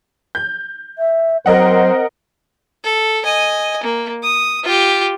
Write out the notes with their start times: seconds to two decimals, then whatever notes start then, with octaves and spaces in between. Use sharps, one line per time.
0.35 G6
0.98 E5
1.46 F#3 C4 A#4 C5 D#5 F#5
2.84 A4
3.24 D#5 G#5
3.83 A#3
4.23 D#6
4.64 F4 G4